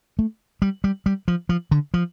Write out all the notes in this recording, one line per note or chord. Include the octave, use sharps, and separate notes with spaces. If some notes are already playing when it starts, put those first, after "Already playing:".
A3
G3
G3
G3
F3
F3
D3
F3